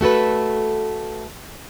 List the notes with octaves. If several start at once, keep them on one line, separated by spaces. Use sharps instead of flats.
A3 F#4 A4 B4